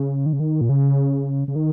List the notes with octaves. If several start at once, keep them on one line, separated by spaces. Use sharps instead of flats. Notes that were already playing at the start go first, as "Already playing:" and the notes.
Already playing: C#3
D#3
C#3
D#3
A#2
C#3
C#3
D#3